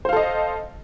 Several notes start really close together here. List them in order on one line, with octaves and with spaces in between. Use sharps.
C5 F5 A4 D#5